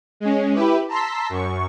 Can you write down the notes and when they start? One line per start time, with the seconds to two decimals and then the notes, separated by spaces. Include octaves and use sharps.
0.20 G#3 C#4
0.54 E4 G4 B4
0.88 A5 A#5 C6 E6 B6
1.29 F#2 C#6